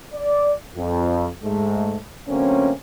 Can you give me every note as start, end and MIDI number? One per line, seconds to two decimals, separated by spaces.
0.14 0.52 74
0.76 1.27 41
1.44 1.97 44
1.44 1.97 56
1.44 1.97 57
2.28 2.71 50
2.28 2.71 54
2.28 2.71 57
2.28 2.71 58
2.28 2.71 60
2.28 2.71 61